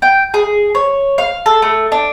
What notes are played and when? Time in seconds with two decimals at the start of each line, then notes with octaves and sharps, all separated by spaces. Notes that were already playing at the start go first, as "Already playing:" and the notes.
0.02 G5
0.34 G#4
0.75 C#5
1.18 F5
1.46 A4
1.62 A3
1.92 D4